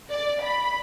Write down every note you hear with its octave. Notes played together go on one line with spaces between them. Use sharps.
D5
B5